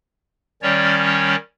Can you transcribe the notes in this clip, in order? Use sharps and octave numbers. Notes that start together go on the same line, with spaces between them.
D#3 G3 C#4 C#5 D5